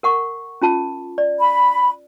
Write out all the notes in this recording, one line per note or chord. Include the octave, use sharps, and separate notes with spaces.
A#4 F#5 C#6
C#4 F4 A5
D5
B5